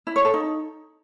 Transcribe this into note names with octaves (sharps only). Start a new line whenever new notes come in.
E4
C#5
A4
D#4